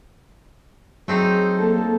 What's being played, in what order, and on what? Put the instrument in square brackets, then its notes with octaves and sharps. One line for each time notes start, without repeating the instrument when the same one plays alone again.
[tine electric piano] F#3 [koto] A3 C4 D#4 [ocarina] G#4
[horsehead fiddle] A#3 A4